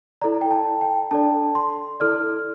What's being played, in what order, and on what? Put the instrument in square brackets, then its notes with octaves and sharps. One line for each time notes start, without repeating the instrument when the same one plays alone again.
[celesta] E4 A4 D5 A#5
G5
A5
G5
D4 A4 D5 A5
C6
E4 A4 D5 F6